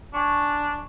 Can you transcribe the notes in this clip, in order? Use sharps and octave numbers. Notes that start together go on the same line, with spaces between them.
D4 G#5 C#6